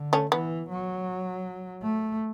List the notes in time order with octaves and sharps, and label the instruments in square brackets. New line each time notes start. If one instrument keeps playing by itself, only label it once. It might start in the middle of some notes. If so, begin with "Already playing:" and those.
Already playing: [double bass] D3
[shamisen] A3 C#4
[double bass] E3 [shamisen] B3
[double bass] F#3
A3